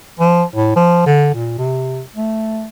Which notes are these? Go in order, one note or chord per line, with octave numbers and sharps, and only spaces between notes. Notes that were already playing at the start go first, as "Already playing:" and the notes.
F3
A2
F3
D3
A#2
C3
A3